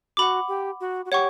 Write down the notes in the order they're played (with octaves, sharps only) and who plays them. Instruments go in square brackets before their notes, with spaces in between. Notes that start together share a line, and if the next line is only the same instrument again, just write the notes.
[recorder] F#4 [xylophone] F#5 B5 D6
[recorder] G4
F#4
F#4
[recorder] G4 [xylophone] C#5 F#5 C#6